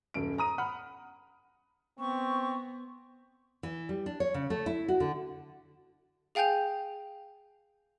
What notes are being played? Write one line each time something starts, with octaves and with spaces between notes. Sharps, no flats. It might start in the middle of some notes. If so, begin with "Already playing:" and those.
D#1 F#2 D7
A#5 D#6 D#7
F#5 B5 F6
B3 C4 C#6
E3
G3
D4
C#5
C#3
A3
E4
F#4
D3
G#4 F5 G5 G#5 G6 F7